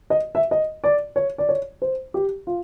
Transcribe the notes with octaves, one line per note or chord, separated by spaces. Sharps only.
D#5
E5
D#5
D5
C#5
D5
C#5
C5
G4
F4